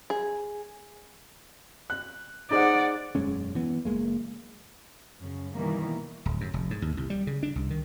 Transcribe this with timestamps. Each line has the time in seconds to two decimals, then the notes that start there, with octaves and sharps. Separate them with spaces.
0.10 G#4
1.90 F#6
2.51 D#4 G#4 C5 D5 F#5
3.15 E1 F#2 G#3 C#4
3.55 E3 B3
3.85 F#1 D#2 G#3 A#3
5.21 F#2 C#3
5.54 B2 D#3 E3 G3 A#3
6.25 D1
6.41 F#2
6.54 F1
6.71 G#2
6.82 D#2
6.97 C2
7.10 G3
7.27 C#3
7.43 D4
7.56 C2
7.70 D#3